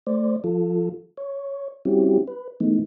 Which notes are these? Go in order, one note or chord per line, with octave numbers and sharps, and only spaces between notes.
A3 C5 D5
F3 F4 A4
C#5
G3 C4 C#4 E4 F#4 G4
B4
E3 G#3 A3 B3 D#4